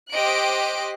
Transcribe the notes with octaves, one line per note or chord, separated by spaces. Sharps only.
G4 C5 D#5 F#6 D7